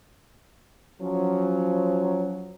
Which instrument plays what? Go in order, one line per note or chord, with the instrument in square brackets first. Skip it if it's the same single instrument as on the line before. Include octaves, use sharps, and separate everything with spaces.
[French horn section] F3 F#3 C#4